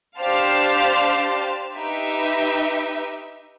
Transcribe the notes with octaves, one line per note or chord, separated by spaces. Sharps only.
D4 G4 C5 F5 A5
D#4 G4 B4 E5